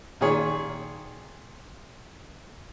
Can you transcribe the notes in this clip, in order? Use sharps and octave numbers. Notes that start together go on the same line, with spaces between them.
A#2 D#3 G#4 C#5